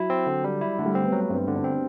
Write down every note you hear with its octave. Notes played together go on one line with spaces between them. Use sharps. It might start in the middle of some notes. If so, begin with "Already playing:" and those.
Already playing: F#3 E4
C4
D3
G3
E4
D3 A3
G3
A3 C4
B3
F#3
G2 C4
D3
D4
C4